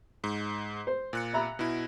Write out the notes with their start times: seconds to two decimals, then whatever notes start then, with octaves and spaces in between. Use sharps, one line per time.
0.24 G#2
0.87 C5
1.13 A#2 F#6 C#7
1.33 E5 A#5 B5
1.59 B2 E4